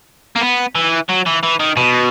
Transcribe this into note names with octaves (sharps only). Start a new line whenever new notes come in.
A#3
B3
E3
F#3
E3
E3
D#3
B2